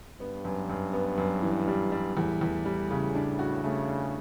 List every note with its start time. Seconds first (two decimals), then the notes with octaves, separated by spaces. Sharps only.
0.20 G2 B3
0.45 F#2
0.70 F#2
0.93 B3
1.18 F#2
1.43 E3
1.67 G3
1.92 G3
2.16 E2 A2
2.41 E2
2.65 G3
2.91 C#3
3.15 D4
3.39 F#4
3.63 C#3 A3
3.88 D4